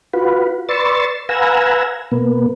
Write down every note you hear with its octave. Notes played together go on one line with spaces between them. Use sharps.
F4 F#4 B4
B4 D5 C6 C#6 E6 A6
B4 F5 F#5 G#5 A#5 E6
B2 A#3 B3